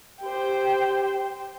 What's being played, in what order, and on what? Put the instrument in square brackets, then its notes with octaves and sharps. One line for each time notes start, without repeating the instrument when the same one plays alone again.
[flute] G4 [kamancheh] C5 G5